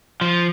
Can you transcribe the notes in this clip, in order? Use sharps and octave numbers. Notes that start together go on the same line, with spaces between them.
F3